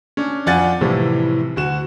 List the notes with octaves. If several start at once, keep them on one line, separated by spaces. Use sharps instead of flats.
C#4 D4
F2 F4 D5 F#5 G#5 A6
A2 C3 E3 F3 G3
D2 F#4 E7